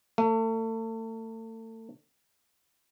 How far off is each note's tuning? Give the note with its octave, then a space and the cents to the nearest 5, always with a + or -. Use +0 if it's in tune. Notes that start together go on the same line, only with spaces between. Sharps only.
A3 +35